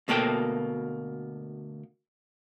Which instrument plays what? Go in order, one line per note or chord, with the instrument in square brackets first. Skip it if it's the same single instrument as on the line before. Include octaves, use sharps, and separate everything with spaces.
[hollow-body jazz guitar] D2 B2 A#3 A4 G5